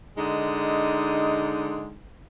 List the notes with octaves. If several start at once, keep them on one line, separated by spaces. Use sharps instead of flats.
D3 G#3 D#4